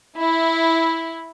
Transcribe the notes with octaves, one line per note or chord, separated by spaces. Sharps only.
E4